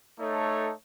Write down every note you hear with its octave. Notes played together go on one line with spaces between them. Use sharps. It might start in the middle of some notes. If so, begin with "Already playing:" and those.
A3 D#4 A4 C#5